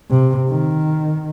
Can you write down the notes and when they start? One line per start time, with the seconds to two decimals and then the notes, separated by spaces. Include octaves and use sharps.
0.10 C3
0.49 D#3